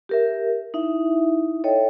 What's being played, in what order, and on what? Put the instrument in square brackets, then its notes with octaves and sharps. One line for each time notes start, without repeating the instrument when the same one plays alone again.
[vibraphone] G4 A#4 E5
D#4 E4 E5
A4 C#5 D#5 E5 G5